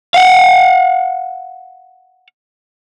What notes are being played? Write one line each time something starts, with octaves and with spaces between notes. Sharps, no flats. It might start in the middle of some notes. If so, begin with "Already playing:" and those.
F5 F#5